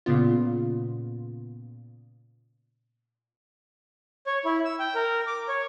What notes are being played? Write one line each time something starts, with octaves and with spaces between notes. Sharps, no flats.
A#2 C#3 B3 F4
C#5
E4
E6
G5
A#4
D6
C#5